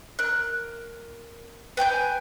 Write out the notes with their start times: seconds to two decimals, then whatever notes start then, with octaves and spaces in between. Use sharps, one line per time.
0.19 A#4 F#6
1.77 B4 G5 G#5 G6